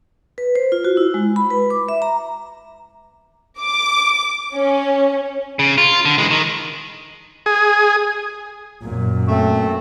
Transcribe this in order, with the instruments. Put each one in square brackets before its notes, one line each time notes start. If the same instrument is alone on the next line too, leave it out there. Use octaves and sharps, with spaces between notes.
[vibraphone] B4
C5
F4
F#4
E4
G#3
B5
B4
D6
E5
A#5
[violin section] D6
C#4
[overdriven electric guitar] C#3
F4
D3
E3 G#3
D#3
[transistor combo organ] G#4
[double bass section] F#2 A#2
[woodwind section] A3 C4